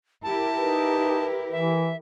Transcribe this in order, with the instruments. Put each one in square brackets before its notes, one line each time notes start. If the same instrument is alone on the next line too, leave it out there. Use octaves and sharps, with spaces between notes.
[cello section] E4 G4 A#4 [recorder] A5
[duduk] D#4 [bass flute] B4
[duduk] E3 [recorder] E5